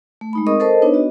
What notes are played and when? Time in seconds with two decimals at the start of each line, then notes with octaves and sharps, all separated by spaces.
0.21 A3
0.33 G#3 D#4 B5
0.46 C4 G#4 A#4 D#5 C#6 D#6
0.60 A4 A#4 C5 D#5 A5
0.82 B3 D4 D#4 B4 C#5
0.94 B3 F#4 D#5